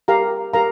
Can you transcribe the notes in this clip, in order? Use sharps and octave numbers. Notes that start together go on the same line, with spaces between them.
G4 A#4 F5 A#5
G4 A#4 F5 A#5